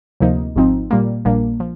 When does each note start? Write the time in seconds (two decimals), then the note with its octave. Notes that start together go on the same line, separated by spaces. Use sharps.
0.20 D2 C3 F3 A#3 D#4
0.56 G#1 G#2 F3 C4 D#4
0.91 A#2 G3 A#3
1.25 A#1 A#2 G3 A#3 D4
1.60 F3